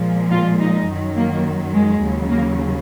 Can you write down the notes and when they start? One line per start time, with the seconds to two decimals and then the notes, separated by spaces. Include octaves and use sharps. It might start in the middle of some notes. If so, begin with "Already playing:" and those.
Already playing: A#2 F3 G#3
0.30 F4
0.59 D#4
0.87 F#2 D#3 F#3
1.15 A#3
1.74 G#3
2.02 D#2 C#3 F#3
2.30 A#3